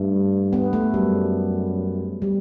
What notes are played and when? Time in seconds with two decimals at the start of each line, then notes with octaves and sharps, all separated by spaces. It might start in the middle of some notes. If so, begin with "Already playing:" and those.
Already playing: G2 A3
0.53 B3
0.73 A3
0.94 F#2 G3
2.22 G3